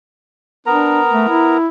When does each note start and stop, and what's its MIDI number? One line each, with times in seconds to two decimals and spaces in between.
0.66 1.57 59
0.66 1.00 62
0.66 1.57 70
0.66 1.57 82
1.11 1.28 57
1.28 1.68 64